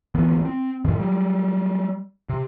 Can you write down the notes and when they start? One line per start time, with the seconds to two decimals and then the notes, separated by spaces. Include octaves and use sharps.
0.15 G#1 D2 E3 B3
0.45 C4
0.85 F#2 A2 D3 D#3
1.00 F#3 G3
2.29 C3